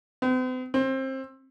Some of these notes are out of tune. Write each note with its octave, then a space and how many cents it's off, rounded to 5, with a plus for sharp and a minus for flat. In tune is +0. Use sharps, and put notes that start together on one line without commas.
C4 -45
C4 +25